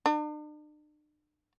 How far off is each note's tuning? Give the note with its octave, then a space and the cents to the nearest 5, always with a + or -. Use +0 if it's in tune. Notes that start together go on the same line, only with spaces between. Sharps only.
D4 +45